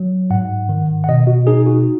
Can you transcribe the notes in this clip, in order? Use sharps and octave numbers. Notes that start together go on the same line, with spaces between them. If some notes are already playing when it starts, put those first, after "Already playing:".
Already playing: F#3
G#2 F#5
D#3
F#5
B2 D#5
F#4
D#4 G#4
F#4